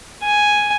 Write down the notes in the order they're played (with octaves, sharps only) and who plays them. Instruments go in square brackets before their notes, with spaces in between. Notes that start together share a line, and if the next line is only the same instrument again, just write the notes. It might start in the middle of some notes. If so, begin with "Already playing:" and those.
[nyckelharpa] G#5